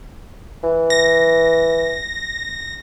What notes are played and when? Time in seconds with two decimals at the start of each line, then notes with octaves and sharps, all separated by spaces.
0.63 E3
0.90 A#6